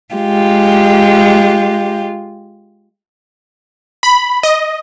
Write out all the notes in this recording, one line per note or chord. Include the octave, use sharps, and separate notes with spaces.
G#3 F4 G4
B5
D#5